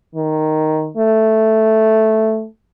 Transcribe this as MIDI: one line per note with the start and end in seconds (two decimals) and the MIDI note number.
0.15 0.90 51
0.97 2.46 57